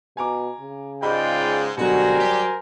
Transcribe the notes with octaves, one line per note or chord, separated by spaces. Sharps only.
B2 G#5 A#5 D6
C#3
G#2 G#3 F4 D5 D#5 G5 B5 G6
B2 D3 F#3 G3 F#4 A#4 C5 G#5
F#3 G4